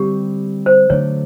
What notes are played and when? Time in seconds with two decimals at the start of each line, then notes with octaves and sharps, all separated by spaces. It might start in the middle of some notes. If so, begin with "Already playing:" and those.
Already playing: D3 G3 C4 G4
0.66 C5
0.90 D3 F#3 A3 D4 C#5